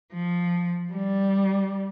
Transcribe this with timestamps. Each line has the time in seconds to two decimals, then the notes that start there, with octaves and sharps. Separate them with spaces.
0.13 F3
0.93 G3